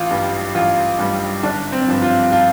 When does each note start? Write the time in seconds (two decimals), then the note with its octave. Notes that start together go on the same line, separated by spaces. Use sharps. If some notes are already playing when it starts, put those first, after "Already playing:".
Already playing: A1 F4
0.11 G2 G3
0.55 A1 F4
0.99 G2 G3
1.43 G1 D4
1.72 C4
1.88 G2 F3
2.02 F4
2.32 F4